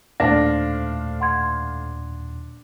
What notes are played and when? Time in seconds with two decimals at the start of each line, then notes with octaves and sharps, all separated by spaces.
0.20 D#2 A#2 A3 D4 C5 F5 A#6
1.20 F#5 C6 G#6